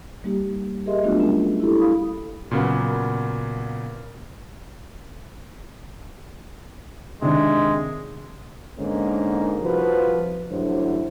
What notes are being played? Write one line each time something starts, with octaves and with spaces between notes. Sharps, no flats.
G3 A#3 D#4 G4
G4 G#4 A#4 D#5 E5 C6
F#3 A3 B3 D4 F4 F#4
G3 C#4 D#4
E4 G4 A4
F5 B5 D#6
A#2 C#3 F#3 A#3 B3
C3 D#3 G#3 D4
G#2 D3 A#3 C#4 D#4
C2 F3 F4 F#4 B4
A1 G2 D3 F#3 E4 C5